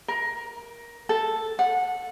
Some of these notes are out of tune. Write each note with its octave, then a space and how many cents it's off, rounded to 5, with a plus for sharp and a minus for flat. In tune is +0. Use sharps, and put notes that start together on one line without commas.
A#4 +15
A4 +0
F#5 -20